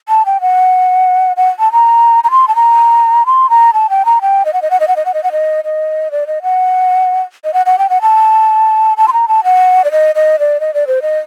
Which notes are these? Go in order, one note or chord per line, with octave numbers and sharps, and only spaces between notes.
A5
G5
F#5
F#5
A5
A#5
A#5
C6
A5
A#5
C6
A#5
A5
G5
A#5
G5
D#5
F#5
D#5
F#5
D#5
F#5
D#5
F#5
D#5
F#5
D#5
D#5
D5
D#5
F#5
D#5
F#5
F#5
G5
F#5
A5
A5
C6
A#5
A5
F#5
D5
D#5
D#5
D5
D#5
D5
C5
D#5